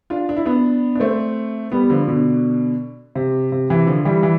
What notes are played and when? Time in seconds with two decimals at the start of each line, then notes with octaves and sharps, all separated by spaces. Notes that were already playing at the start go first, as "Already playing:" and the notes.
0.10 D4 F4
0.29 D4
0.37 E4
0.45 B3 D4
0.95 D4
1.00 A3 C4
1.72 G3 B3
1.84 G3
1.90 D3 F3
2.08 B2 D3
3.15 C3
3.52 C3
3.70 C3 E3
3.87 D3 F3
4.05 E3 G3
4.23 E3